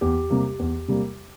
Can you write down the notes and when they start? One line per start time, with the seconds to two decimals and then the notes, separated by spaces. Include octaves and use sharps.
0.01 E2 G4
0.30 C3 G3 A#3
0.59 E2
0.88 C3 G3 A#3